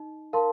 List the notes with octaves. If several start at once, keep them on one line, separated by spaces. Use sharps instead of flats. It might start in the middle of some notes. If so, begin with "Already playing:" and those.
Already playing: D#4
A#4 F5 A5 C6